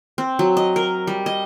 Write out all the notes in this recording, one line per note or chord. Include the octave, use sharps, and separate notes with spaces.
C4
F#3
D#5
A#4
G3
D#5